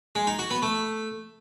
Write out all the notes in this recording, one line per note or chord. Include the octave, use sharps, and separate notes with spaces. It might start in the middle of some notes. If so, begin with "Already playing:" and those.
G#3
D#4
F#4
B3
A3